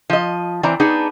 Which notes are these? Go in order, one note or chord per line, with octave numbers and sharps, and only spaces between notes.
F3 D#5
E3 C4 D5 A#5
B3 D4 D#4 G#4